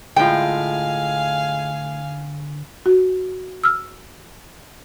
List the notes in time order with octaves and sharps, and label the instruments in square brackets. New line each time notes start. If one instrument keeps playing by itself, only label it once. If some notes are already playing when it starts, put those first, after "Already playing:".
[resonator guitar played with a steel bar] A2 G5 [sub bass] D3 [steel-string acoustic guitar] G#3 F4 [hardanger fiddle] F5 G#5
[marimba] F#4
E6 F6